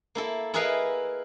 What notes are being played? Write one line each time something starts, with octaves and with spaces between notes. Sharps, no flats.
A#3 E4 A4
E4 G#4 A#4 B4 D#5 F5